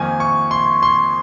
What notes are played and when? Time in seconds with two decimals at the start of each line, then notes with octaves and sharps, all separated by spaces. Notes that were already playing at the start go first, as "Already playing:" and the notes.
Already playing: F2 D#3 A#3 G#5
0.20 C#6
0.51 C6
0.83 C6